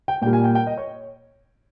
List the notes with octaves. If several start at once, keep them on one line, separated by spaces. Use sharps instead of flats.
G5
A#2 G3 A#3 G5
G#5
G5
G5
D#5
C#5